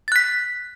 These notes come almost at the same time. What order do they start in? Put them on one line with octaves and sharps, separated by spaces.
A6 F#6 B6